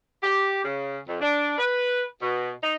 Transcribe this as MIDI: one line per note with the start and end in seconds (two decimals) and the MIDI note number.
0.23 0.61 67
0.64 0.99 49
1.08 1.18 41
1.21 1.57 62
1.58 2.04 71
2.22 2.52 47
2.63 2.76 63